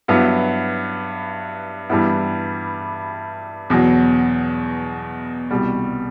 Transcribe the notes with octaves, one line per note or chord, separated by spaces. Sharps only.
G2 F#3 B3 E4
G2 E3 G3 B3 E4
E2 B2 F#3
C2 B2 G3